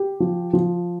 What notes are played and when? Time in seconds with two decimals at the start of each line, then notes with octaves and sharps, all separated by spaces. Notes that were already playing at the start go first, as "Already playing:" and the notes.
Already playing: G4
0.20 F3
0.53 F3